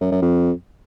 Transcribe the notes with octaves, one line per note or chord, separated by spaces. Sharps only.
F#2
F#2
F2